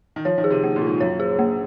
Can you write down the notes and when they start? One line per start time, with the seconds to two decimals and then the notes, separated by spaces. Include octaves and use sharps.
0.16 D#3
0.25 F3 C#5
0.38 D#3
0.44 G#4
0.51 C3
0.64 A#3
0.76 A#2
0.82 F4
0.87 G#2
1.01 F#2 C#5
1.20 G#4
1.39 A#3